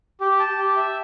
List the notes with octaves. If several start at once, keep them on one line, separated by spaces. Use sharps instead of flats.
G4
A5
G4
E5